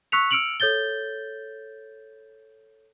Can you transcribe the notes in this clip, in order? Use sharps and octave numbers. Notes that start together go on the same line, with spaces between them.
C#6 E6 F#6 B6 C#7 F7
E6 F6 C#7 D7 F7 F#7
A4 C#5 G6 A6 G7